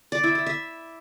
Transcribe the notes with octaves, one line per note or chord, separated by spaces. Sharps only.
D5
E4
E5
E5